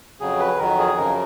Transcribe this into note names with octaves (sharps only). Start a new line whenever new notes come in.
F2 C#3 F#3 G#4
B4
F2 D#3 F#3 A#4
G#4
F#2 C#3 F3 A#4